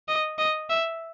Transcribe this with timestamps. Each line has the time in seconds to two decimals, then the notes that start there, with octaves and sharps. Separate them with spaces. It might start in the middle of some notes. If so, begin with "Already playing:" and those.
0.08 D#5
0.38 D#5
0.69 E5